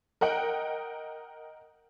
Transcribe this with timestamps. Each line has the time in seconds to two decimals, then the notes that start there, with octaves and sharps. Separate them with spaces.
0.21 A#4 D#5 F#5 G5